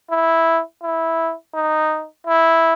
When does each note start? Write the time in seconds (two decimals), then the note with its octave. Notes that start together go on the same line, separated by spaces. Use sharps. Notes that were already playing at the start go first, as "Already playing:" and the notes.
0.11 E4
0.83 E4
1.55 D#4
2.27 E4